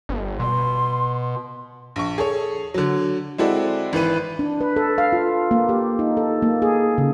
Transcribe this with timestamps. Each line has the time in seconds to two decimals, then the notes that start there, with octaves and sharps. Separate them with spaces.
0.09 G1
0.40 B2 C6
1.96 A#1 C#6
2.18 G#4 A4 C#5
2.74 D3 F#3
3.38 G#3 C4 E4 F#4 A4 D5
3.93 G#1 E3 B4 D#7
4.39 D4
4.61 B4
4.76 A4
4.98 F5
5.13 F4
5.51 A#3
5.69 G4
5.99 D#4
6.17 A4
6.42 A#3
6.62 G#4
6.98 C#3